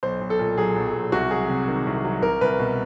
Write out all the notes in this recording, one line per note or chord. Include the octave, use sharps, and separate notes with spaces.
B1 C5
B1
A4
A#2
F#3 G#4
B1
B1
C2 F#4
F#3 G#4
C3
D#3
C2
F#3
C2 A#4
C2 B4
B2